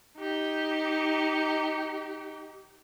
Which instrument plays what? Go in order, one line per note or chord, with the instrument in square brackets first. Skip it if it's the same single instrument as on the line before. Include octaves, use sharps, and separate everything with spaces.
[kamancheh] D#4 G4